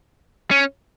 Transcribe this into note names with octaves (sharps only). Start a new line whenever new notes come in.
C#4